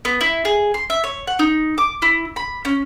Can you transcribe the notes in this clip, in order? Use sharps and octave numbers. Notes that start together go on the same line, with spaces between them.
B3
E4
G#4
C6
E5
C#5
F#5
D#4
D6
E4
B5
C#4